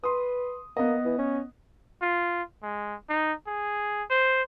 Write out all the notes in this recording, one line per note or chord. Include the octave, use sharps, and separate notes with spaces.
B4 C6 D#6
A#3 B3 D#5
E3
C#4
F4
G#3
D#4
G#4
C5